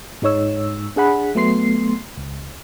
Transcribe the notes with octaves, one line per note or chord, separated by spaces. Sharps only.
G#2 G#3 D#4 C#5 E6
D4 G#4 F#5 B5
F#3 A3 B3 C6 C7
C#2